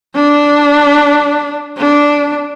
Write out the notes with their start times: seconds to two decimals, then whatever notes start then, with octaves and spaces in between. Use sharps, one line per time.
0.15 D4
1.77 D4